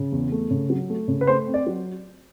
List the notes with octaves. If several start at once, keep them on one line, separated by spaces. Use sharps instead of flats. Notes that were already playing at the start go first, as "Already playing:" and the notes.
Already playing: C#3
E2
A3
C#3
F#3
A3
C#3
B4
A3 C5
C4
D5
F#3